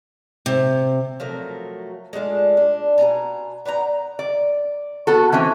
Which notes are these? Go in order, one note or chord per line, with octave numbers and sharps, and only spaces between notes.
C3
F3 F#3 A3 A#4
G#3 A3 D4 F4
D4
B2 D4 G#5 A#5
B3 D5 G5 A#5
D5
B3 F#4 A4
E3 C4 C#4